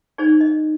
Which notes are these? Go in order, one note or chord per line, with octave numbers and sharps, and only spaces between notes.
D#4 G#4 C5 D5
D#5